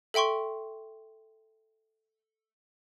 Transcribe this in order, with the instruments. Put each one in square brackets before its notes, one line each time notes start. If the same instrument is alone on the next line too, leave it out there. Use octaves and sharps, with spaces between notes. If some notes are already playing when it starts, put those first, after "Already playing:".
[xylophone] A4 E5 G5 C6 C#6